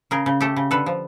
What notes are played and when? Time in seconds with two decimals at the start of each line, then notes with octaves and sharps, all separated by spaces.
0.11 C#3 G#4 A#4
0.26 C#3
0.41 A3 G4 A4
0.56 C#3
0.71 D3 A4 B4
0.86 F3